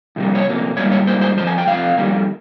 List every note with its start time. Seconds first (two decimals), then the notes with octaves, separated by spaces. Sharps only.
0.16 F2 C3 G3 A#3
0.35 C#5
0.46 F2 C3 A#3
0.76 G#2 G3 A#3 C#5
0.92 C#5
1.07 G#2 G3 A#3 C5
1.21 C5
1.37 F2 C3 F3 C5
1.47 G#5
1.58 G5
1.67 F2 C3 F3 F5
1.98 F2 D#3 G3 A#3